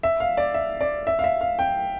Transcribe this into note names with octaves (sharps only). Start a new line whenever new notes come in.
E5
F5
D5
E5
D5
E5
F5
E5
F5
G5